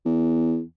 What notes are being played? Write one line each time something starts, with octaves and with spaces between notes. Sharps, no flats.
E2